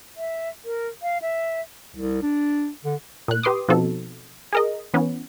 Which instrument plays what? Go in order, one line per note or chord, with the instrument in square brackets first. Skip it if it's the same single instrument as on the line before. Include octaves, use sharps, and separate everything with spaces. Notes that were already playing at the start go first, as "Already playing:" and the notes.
[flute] E5
A#4
F5
E5
[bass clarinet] C2
D4
D3
[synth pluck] A#2 F#6
G4 B4 C6 D6 D#6
B2 F3 C4 D#4 F#4 A4
G#4 A#4 D#5
E3 B3 C#4